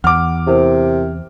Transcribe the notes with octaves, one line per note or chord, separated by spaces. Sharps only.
E2 F#5 D6 F6
C3 E4 A#4 C5